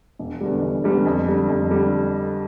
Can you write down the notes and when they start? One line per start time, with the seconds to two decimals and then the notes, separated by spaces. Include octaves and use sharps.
0.19 E1
0.41 E2 D3 G3
0.62 E1
0.84 E2 D3 G3
1.06 F2
1.27 D3 G3
1.49 F2
1.71 D3 G3